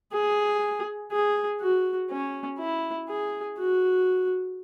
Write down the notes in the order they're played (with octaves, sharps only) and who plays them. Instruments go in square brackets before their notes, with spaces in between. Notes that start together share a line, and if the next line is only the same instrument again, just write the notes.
[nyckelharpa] G#4
G#4
F#4
C#4
E4
G#4
F#4